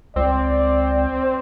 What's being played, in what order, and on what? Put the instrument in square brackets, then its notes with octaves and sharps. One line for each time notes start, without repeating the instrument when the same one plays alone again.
[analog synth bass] C#2 [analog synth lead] C4 [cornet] D5